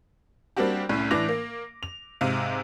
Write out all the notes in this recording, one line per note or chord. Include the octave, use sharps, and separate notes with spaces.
G3 A#3 C4 D4 F#4 G4
C2 A2 C#4
A2 E3 D4 D6 A#6 F7
A#3
F7
G#2 C3 F5